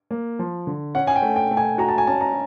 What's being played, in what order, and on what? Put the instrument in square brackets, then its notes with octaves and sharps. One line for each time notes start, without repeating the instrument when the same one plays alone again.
[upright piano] A#3
F3
D3
[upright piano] C#4 [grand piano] F#5
[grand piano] G#5
G5
[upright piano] A3
[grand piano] G5
[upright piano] A3
[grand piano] G#5
[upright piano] F#4 [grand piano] A#5
[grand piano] A5
G#5
[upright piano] C#4 [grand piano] A5
[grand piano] A#5